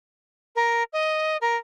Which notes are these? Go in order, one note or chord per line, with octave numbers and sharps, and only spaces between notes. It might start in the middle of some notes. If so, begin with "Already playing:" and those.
A#4
D#5
A#4